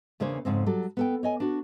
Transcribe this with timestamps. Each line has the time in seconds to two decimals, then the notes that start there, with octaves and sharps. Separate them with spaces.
0.20 E2 C#3 A#3 D4 C5 C#5
0.45 F2 G#2 C#3 C4
0.66 F#3 G3 A4
0.97 B3 A4 G5
1.23 C#5 D#5 G#5
1.40 D4 F#4